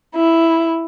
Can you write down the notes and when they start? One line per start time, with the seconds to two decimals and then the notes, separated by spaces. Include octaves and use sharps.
0.16 E4